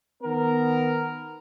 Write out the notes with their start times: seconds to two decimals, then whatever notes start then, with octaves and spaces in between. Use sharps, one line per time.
0.23 D#3 B3 A#4